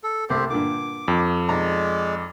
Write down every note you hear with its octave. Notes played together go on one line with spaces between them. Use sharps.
A4
C2 A3 C4 G4 C5
G2 A#2 D3 D6
F2
B1 G#3 D5 A#5